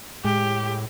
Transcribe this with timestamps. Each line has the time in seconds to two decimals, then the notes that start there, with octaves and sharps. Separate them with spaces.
0.25 A2 G#3 G4